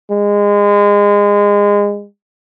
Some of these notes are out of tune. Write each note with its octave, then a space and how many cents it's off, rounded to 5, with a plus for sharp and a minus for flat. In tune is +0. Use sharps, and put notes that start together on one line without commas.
G#3 -25